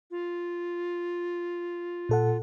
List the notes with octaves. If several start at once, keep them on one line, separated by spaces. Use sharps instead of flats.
F4
A#2 A4 F#5